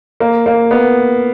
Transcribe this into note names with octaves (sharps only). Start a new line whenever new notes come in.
A#3
A#3
B3